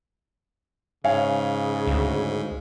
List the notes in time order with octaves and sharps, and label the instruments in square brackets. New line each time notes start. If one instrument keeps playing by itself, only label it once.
[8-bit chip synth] G#2 [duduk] C#3 [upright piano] C#5 F5 G#5
[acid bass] D2